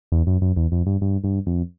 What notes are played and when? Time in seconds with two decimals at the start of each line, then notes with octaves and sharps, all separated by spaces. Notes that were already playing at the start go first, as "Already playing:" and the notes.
0.12 E2
0.27 F#2
0.42 F#2
0.56 E2
0.72 F2
0.86 G2
1.02 G2
1.24 G2
1.47 F2